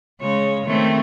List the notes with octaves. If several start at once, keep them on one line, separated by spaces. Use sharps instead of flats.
C#3 G#3 C#5
D#3 A3 C4